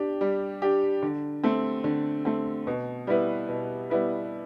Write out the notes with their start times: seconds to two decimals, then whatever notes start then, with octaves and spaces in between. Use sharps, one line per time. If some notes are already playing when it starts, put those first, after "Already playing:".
Already playing: D4 G4
0.21 G3
0.62 D4 G4
1.02 D3
1.44 A3 C4
1.84 D3
2.25 A3 C4
2.67 B2
3.07 G3 B3 E4 B4
3.49 B2
3.90 G3 B3 E4 B4